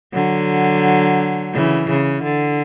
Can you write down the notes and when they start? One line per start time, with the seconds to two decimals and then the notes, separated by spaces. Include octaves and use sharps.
0.13 D3 F#3
1.53 C#3 E3
1.89 C#3
2.23 D3